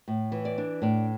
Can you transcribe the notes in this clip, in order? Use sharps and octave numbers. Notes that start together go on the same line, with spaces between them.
A2
E3
D5
D4
A2 D5